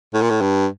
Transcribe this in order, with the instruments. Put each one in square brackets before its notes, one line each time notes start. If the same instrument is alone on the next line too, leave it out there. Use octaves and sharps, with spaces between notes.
[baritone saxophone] A2
A#2
A2
G2